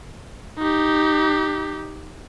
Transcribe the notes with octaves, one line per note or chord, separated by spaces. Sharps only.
D#4 G4